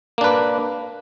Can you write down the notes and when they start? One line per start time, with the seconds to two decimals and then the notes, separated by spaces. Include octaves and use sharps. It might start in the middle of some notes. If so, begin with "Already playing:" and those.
0.18 A#3
0.21 D4
0.24 B4